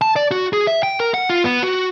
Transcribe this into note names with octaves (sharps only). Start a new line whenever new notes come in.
A5
D5
F#4
G#4
E5
G5
A#4
F#5
F4
B3
F#4